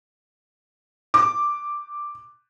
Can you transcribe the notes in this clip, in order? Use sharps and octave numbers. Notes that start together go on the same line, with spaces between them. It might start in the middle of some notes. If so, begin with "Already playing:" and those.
D6